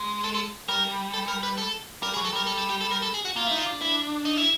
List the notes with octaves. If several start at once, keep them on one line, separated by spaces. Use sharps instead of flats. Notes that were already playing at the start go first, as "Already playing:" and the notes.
Already playing: G#3
A4
A4
G3 A#4
A4
A#4
B4
A4
G3 A#4
G#4
F#3
A4
G3 A#4
A4
A4
G4
A4
A#4
A4
G#4
F#4
A#3 F4
D#4 E4
F4
D4
E4
D#4
E4